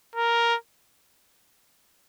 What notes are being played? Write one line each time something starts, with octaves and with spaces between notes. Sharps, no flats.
A#4